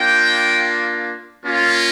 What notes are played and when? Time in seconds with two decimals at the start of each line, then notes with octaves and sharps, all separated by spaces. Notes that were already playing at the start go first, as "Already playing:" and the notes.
Already playing: A#3 D4 F4 G5
1.45 A#3 C#4 F4